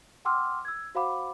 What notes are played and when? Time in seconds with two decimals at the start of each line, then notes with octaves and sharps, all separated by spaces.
0.25 F#5 G5 C6 D6 E6 F6
0.65 E6 G#6
0.95 F#4 C5 F5 F#5 B5 D6